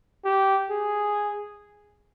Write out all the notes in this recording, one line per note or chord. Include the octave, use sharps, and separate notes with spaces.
G4
G#4